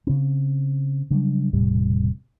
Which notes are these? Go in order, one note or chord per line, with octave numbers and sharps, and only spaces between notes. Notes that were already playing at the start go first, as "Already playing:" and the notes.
C#3 C4
C#3 F#3 G3 D4
E1 A2 C3 G3